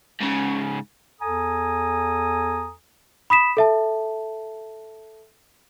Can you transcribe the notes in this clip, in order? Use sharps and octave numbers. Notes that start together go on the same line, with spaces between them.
G#2 C#3
E2 A4 G#5 A#5 D#6
B5 D#6 B6 E7
A4 E5 A5